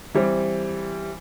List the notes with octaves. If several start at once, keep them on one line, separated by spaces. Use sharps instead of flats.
E3 G3 C4